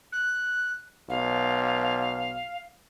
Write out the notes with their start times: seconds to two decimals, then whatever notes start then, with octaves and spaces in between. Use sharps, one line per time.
0.12 F#6
1.10 B1 F5